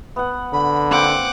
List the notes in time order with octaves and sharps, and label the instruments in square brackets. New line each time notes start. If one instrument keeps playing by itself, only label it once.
[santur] B3 F#5
[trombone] D3 [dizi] B5
[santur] A#3 C4 G5 [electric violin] F#5 D6